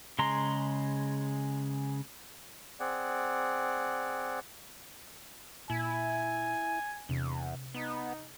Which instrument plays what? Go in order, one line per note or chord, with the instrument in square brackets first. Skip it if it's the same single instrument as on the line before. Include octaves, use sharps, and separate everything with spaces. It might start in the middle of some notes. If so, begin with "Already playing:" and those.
[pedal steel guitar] C#3 G#3 A#5 C6
[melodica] C4 G#4 D5 F#5
[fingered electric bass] A#2 [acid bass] E4 [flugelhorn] G#5
[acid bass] E2 [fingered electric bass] C3 D4
[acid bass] B3 [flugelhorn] D#4